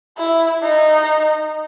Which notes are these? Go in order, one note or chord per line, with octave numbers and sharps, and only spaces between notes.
E4
D#4